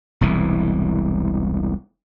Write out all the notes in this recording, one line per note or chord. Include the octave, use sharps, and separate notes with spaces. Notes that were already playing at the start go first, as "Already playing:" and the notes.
E1 C2 E3